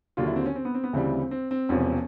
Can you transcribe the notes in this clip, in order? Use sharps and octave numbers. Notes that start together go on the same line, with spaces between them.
D#2 D3 F#3 F4
E4
C4
C#4
C4
B3
C4
B3
D2 C#3 E3 G3 C4
C4
C4
C4
E1 E2 C3 F3 C#4